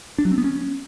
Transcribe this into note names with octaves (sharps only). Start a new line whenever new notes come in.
D4
F#3
C4
B3
C#4